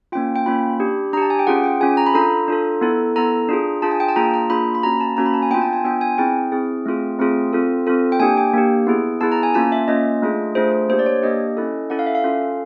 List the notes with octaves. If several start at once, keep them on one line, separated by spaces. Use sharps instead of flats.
A#3 C#4 F4 G5
G5
A#3 C#4 F4 B5
D4 G4
D4 G4 A5 A#5
G#5
G5
C#4 F4 G#4 F#5
G5
C#4 F4 G#4 G#5
A#5
B5
D4 F4 A4 A#5
D4 F4 A4
B3 E4 A4
B3 E4 A4 A#5
D4 F4 G#4
D4 F4 G#4 A5
G#5
G5
A5
A#3 D4 F4 G#4 A#5
A#5
A#3 D4 F4 G#4 B5
B5
A#3 C#4 F#4 A#5
A5
A#3 C#4 F#4 A#5
B5
A5
G#5
B3 D4 F4 G5
A5
G#5
B3 D4 F4 G5
G#5
C4 E4 G#4 G5
C4 E4 G#4
A3 C4 F4 G#4
A3 C4 F4 G#4
C4 F4 A4
C4 F4 A4
G5
A#3 D4 G4 G#5
G5
A#3 D4 G4
B3 E4 G#4
B3 E4 G#4 A5
A#5
G#5
A#3 C#4 F4 A5
E5
A#3 C#4 F4 D#5
A3 D4 F4 G#4
A3 D4 F4 G#4 C5
C5
A#3 D4 G4 C5
D5
C#5
A#3 D4 G4 D#5
C#4 E4 A4
C#4 E4 A4 F#5
F5
E5
F5
C#4 F4 A4